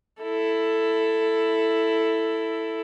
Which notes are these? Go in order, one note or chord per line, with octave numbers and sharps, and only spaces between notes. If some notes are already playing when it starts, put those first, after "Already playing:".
E4 A4